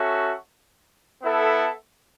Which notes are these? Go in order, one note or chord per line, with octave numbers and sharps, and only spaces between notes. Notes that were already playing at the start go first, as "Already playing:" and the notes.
Already playing: C#4 F#4 A4 E5
B3 E4 A4 E5